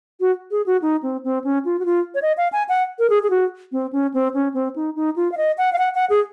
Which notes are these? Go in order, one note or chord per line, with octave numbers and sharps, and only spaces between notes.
F#4
G#4
F#4
D#4
C4
C4
C#4
F4
F#4
F4
C#5
D#5
F5
G#5
F#5
A#4
G#4
G#4
F#4
C4
C#4
C4
C#4
C4
D#4
D#4
F4
F5
D#5
F#5
F5
F#5
F#5
G#4